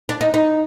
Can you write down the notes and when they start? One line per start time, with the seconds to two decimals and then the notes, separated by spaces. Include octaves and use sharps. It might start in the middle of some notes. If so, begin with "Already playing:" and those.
0.09 D4
0.21 D#4
0.34 D#4